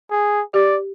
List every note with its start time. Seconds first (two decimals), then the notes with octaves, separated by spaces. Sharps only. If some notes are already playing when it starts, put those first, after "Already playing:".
0.11 G#4
0.54 G4 D5